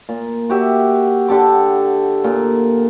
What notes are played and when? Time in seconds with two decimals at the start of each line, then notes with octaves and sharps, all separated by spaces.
0.09 A#2
0.49 F#4 G4 E5
1.28 D3 G4 A4 D6
2.24 A#2